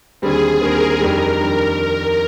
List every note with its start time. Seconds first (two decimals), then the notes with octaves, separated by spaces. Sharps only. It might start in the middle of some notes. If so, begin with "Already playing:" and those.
0.22 D#2 D3 G3 C4 G#4
0.61 D#2 D3 G3 C4 A#4
1.01 F2 D#3 G3 D4 A#4
1.40 D#3 G3 D4